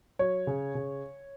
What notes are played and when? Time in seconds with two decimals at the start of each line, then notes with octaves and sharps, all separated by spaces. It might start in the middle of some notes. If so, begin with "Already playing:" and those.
0.19 F#3 C#5
0.47 C#3
0.75 C#3